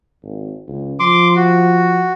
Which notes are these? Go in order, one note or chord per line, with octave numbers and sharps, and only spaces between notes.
G#1
C#2
F3 C6 D6
F#4